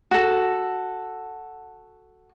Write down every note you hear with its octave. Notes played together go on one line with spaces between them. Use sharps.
F#4 A4